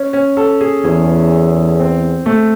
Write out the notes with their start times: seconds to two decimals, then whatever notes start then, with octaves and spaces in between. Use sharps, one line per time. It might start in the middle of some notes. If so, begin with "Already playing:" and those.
Already playing: C#4
0.13 C#4
0.37 A4
0.61 G#4
0.84 E2 G#4
1.79 C4
2.26 A3